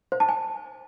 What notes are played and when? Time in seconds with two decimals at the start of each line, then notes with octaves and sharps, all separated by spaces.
0.12 C5
0.20 A5
0.29 G#5